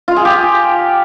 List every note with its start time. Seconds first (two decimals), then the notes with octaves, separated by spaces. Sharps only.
0.08 F4
0.16 G#4
0.25 G4